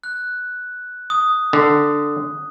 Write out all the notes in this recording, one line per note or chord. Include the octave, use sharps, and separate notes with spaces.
F#6
D#6
D3